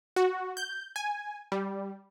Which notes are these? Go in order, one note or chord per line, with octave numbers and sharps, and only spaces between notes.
F#4
G6
G#5
G3